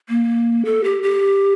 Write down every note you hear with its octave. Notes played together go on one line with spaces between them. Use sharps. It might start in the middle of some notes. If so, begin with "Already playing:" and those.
A#3
A4
G4
G4